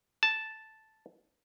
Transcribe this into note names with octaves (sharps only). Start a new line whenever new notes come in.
A5